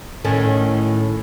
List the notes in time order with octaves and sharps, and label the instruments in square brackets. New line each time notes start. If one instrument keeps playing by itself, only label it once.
[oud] A2 D#3 C#4